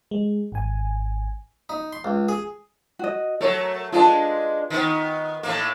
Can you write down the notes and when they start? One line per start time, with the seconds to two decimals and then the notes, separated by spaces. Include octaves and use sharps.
0.11 G#3
0.52 G#1 G#5
1.69 D#4
1.93 C6
2.05 C#2
2.29 G#4
2.99 F#4 D#5
3.41 F#3 A3 A#4 C#5
3.92 G#3 D4 F4 B4 A5
4.70 D#3 B3
5.43 A2 A3 A#3